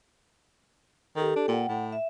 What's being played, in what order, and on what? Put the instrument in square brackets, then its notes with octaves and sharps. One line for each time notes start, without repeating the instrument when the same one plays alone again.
[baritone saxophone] D#3 [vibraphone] G4 A4
[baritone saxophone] D4
[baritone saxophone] A#2 [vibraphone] F#5 G5
[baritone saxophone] A2
[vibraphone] E5